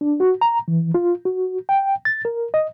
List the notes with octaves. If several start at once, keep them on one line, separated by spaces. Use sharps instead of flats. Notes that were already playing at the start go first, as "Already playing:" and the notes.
D4
F#4
A#5
E3
F4
F#4
G5
A6
A#4
D#5